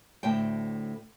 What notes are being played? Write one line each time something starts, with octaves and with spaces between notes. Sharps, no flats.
D2 A2 C5 G5